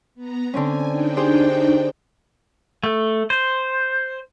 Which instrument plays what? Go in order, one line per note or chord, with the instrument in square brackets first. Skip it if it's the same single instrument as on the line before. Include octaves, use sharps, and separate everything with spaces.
[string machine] B3 A#5
[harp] D3 C4 C#4 [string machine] G#5
[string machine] D4 D#4 G5
[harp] G4 G#4 C5
[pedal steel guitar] A3
C5